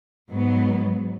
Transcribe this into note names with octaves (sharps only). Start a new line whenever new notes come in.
G#2 F#3 B3